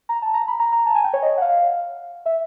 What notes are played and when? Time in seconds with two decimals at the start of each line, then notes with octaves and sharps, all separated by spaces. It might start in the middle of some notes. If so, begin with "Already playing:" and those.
0.09 A#5
0.22 A5
0.34 A#5
0.48 B5
0.59 A#5
0.72 A#5
0.86 A5
0.95 G#5
1.04 G5
1.14 C#5
1.23 D#5
1.37 F#5
1.42 F5
2.26 E5